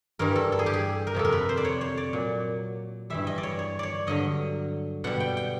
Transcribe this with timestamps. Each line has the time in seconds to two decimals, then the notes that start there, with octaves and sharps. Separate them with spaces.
0.19 G2 E3 G3 A#4
0.35 A4
0.52 A4
0.59 G#4
0.66 G4
0.74 G#4
1.07 A#4
1.15 F2 C3 F3 A4
1.25 A#4
1.32 B4
1.49 C5
1.57 D5
1.65 C#5
1.81 C#5
1.97 D5
2.13 A#2 F#3
3.10 G2 E3 G3 E5
3.27 D#5
3.38 D5
3.43 C#5
3.59 C#5
3.79 C#5 D5
4.07 G2 D3 F#3 D#5
5.04 B2 G3 F#5
5.20 G5
5.37 G5